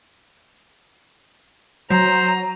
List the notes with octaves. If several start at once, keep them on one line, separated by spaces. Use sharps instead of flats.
F#3 C5 A#5